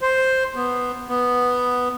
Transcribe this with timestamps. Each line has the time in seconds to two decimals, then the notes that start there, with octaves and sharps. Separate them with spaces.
0.01 C5
0.56 B3
1.08 B3